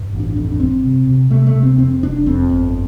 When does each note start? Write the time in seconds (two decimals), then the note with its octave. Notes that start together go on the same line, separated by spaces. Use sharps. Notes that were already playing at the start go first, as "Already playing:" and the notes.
Already playing: G2
0.13 A1
0.20 D4
0.36 F2 D4
0.60 G1 C4
0.84 C3
1.07 C3
1.31 C3 A3
1.47 A3
1.55 C3
1.63 C4
1.78 F2 C4
2.03 F1 D4
2.26 F2 C4
2.50 G1